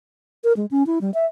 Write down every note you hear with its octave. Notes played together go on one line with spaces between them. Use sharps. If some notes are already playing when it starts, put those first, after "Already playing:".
A#4
G#3
C#4
E4
G3
E5